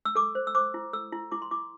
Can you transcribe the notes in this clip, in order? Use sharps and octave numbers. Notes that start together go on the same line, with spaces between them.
E6
A4 D6
C5
E6
C5 D6
E4
A4 E6
E4
E4 D6
C6
E4 D6